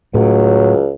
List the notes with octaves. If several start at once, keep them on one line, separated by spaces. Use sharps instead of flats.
C#2 A2 F#3